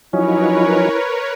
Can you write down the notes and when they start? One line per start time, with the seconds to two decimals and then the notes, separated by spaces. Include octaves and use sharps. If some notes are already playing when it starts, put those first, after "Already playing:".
0.13 F3 F#3 C#4 D#4 E4 A#4 B4 C#5